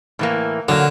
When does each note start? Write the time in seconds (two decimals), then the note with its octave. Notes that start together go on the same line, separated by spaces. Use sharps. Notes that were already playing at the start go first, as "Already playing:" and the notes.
0.19 A2 E3 A#3
0.69 D3 F#3 A#3